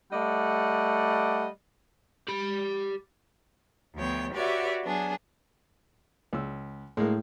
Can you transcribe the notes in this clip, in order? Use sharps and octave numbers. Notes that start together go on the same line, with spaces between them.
G3 A3 D5 D#5 F#5
G4 B5
D2 F3 B3 C#5 G5
F#4 G4 B4 C#5 D5 E5
F#3 B3 D4 G#4
C#2 E6
A2 G#3 A#3